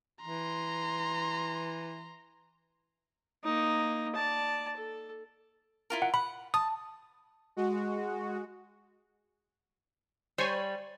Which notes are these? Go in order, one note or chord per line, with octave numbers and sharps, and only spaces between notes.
E3 A#5 C6
A#3 D#4
D5 A5
A4
E4 F4 A#4
F#5
F#5 B5
A5 D#6
G#3 F#4
G3 C5 C#5 G#5